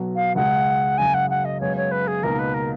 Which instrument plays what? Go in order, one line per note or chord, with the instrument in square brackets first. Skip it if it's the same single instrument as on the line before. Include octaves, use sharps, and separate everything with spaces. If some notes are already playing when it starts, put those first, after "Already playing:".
Already playing: [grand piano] B1 B2 F#3
[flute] F5
[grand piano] C#2 C#3 G#3 [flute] F#5
[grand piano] F#1 F#2 C#3 [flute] G#5
[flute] F#5
F#5
D#5
[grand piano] F#2 C#3 G#3 B3 [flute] C#5
[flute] C#5
B4
G#4
[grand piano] C#2 B2 A#3 D#4 [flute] A#4
[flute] B4
A#4